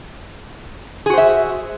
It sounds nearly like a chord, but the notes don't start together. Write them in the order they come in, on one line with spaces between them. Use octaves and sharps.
G#4 F#4 C5 E5